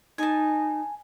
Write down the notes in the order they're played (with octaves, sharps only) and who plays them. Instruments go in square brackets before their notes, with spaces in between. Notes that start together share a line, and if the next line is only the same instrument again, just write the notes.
[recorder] D#4 [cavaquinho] G#5 A5